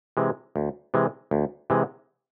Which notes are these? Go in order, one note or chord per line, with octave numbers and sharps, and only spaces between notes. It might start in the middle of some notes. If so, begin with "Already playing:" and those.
C3 E3 G#3
D2
C3 E3 G#3
D2
C3 E3 G#3